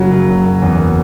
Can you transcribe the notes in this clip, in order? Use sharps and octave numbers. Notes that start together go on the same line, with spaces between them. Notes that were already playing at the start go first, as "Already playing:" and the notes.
Already playing: F#1 C#3 F#3
F#1
F#1
F#1
E2
F#1